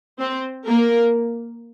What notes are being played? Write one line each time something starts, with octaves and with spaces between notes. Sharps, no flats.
C4 C5
A#3 A#4